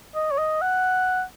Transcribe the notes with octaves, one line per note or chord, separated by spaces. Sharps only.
D#5
C#5
D#5
F#5